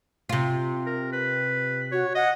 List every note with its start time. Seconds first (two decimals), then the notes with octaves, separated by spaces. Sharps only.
0.29 C3 F4
0.87 A#4
1.13 B4
1.92 F#4 C#5
2.15 D#5 F#5